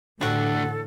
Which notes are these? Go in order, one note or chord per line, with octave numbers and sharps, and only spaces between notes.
A1 D2 A2 D3 G3 D4 F#4 A4